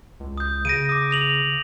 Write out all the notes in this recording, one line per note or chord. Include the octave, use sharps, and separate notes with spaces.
C#2
D#6 G6
C#3 A#6 D7 D#7
D6 D#6
A#6 F7 F#7